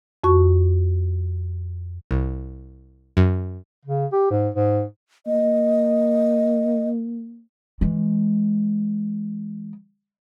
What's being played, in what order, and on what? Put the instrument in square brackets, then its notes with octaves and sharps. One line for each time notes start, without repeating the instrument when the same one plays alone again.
[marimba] F2 F#4 C#6
[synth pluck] C2
F#2
[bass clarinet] C#3
G4
G#2
G#2
[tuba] A#3 [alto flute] D#5
[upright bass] E3 G#3